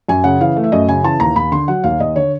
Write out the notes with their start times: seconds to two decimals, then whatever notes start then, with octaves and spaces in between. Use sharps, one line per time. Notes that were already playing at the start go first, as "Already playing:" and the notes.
0.08 F#2 G#5
0.24 C#3 F#5
0.41 E3 F5
0.56 A3
0.64 E5
0.72 F#2 D#5
0.88 C#3 G#5
1.04 E3 A5
1.20 D#2 A#5
1.36 D#2 B5
1.52 D3 C6
1.68 F#3 F#5
1.84 D#2 F5
2.00 D#2 D#5
2.16 D3 C#5